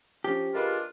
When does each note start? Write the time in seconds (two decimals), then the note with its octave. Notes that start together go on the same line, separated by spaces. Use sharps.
0.24 F3 C#4 G4
0.54 G#3 D4 F4 A#4 B4